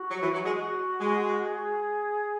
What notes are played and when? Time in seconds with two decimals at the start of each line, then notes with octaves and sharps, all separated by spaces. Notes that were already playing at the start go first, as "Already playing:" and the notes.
Already playing: F#4
0.11 F#3
0.22 E3
0.34 F#3
0.45 G#3
0.55 F#4
1.00 G#3
1.45 G#4